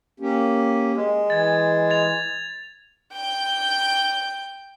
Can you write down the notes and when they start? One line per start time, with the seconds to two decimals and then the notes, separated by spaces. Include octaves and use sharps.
0.20 A#3 C#4 G4
0.97 G#3
1.30 E3 G#6 A6
1.90 G#6 A6 F7
3.13 G5 G6